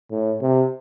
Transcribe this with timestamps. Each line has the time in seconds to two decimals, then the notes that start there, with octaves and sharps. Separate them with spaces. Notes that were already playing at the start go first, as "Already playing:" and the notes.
0.11 A2
0.41 C3